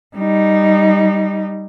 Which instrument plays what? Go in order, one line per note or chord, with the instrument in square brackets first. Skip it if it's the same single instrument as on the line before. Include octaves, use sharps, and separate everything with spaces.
[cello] G3 D#4